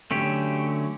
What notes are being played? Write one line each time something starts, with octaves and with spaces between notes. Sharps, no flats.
D3 F#3 A3 C#4 G4